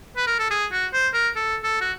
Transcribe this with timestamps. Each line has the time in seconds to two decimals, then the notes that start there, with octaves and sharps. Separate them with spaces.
0.17 B4
0.27 A#4
0.39 A4
0.51 G#4
0.72 F#4
0.93 C5
1.14 A#4
1.36 A4
1.64 A4
1.81 F#4